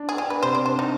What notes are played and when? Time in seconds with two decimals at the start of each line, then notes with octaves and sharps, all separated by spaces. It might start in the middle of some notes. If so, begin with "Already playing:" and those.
Already playing: D4
0.09 G#4
0.17 D4 G4
0.30 B4
0.42 C3 C5
0.55 D5
0.66 D4 C5
0.79 D#4